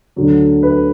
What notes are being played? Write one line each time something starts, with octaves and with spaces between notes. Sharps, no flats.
D2 D3 F#3
B4